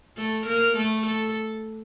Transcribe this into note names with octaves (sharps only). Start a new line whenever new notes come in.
A3 A4
A#3 A#4
A3 A4
A4